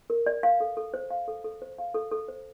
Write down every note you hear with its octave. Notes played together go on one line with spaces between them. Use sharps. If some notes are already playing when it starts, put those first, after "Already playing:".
A#4
D5
F5
A4
A4
C5
F5
A4
A4
C5
F5
A4
A4
C5